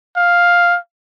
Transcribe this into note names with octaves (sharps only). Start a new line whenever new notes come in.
F5